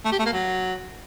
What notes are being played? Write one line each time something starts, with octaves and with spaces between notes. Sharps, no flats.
A3
G4
A3
A#3
F#3